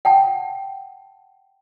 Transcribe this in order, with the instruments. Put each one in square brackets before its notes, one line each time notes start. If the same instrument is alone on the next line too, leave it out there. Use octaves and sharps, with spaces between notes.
[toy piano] F#5 G5 A5